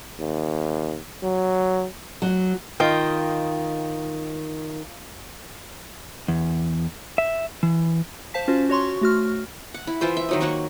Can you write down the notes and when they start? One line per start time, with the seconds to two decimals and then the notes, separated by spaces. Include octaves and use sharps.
0.19 D#2
1.23 F#3
2.22 F#3
2.80 D#3 F4 D#5 G5
6.28 E2
7.18 E5
7.63 E3
8.34 C5 F5 A5 B6
8.48 C#4 F4 F#4 C5
8.69 F#4 C#5 C6 C#6
9.01 A3 F#4 F6
9.74 F#5
9.87 E4
10.01 E3 F4 C5 E5
10.17 E5
10.29 D#3 F#3 D#5
10.41 F#3 A#3 F#5 C#6